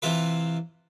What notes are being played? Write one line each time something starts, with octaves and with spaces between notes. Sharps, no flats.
C3 E3 F4 B4